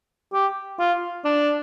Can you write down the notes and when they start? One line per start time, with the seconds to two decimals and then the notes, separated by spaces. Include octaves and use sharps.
0.33 G4
0.79 F4
1.25 D4